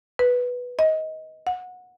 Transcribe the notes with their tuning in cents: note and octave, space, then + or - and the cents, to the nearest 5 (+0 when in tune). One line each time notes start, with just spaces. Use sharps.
B4 -5
D#5 +20
F#5 -20